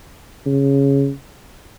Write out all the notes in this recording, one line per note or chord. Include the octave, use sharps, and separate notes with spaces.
C#3